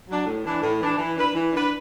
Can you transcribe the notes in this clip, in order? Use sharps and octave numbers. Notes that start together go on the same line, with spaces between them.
F#3 D4
A2
E3 D4
A2
E3 D4
E3
D4 B4
E3
D4 B4